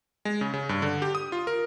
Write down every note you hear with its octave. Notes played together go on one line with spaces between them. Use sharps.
G#3
C#3
C#3
G2
D3
G4
D#6
F4
A#4